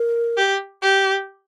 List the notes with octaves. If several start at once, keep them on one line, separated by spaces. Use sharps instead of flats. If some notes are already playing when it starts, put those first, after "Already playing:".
Already playing: A#4
G4
G4